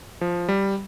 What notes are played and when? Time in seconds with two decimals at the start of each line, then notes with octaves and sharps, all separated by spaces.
0.21 F3
0.49 G3